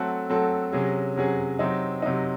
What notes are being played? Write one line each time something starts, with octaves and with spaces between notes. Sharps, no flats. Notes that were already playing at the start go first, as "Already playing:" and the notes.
Already playing: F#3 A3 C4 F#4 A4
F#3 A3 C4 F#4 A4
C3 F#3 C#4 G#4
C3 F#3 C#4 G#4
C3 F#3 C4 D#4
C3 F#3 C4 D#4